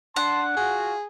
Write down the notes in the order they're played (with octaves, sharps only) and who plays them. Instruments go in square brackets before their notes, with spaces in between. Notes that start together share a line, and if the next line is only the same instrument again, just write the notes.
[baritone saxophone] D4 [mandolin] F#5 [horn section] A5 C6
[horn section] F4 F#4 [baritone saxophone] G#4